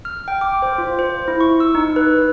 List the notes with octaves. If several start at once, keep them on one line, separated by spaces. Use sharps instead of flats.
F6
G5
D6
C5
F4
C5
E4
C#6
E6
D#4
B4